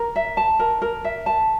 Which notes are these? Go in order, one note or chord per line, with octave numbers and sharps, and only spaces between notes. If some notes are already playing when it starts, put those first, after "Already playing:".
Already playing: A#4
E5
A5
A#4
A#4
E5
A5